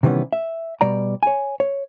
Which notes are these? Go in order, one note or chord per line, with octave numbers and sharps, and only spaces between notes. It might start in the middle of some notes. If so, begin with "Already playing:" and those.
C3 D#3 E3 G3 B3 C#4
E5
B2 G3 D5 A#5
C#5 G#5
C#5